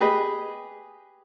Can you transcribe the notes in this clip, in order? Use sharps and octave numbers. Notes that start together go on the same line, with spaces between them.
G4 G#4 B4 D#5